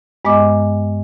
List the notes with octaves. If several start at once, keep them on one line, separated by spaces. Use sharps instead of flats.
G2 G#3 B3 D#5 D6